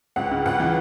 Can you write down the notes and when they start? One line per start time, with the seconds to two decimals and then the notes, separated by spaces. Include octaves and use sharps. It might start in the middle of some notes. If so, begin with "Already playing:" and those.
0.16 C#2 F#5
0.31 C#3
0.46 C#2 F#5
0.60 E3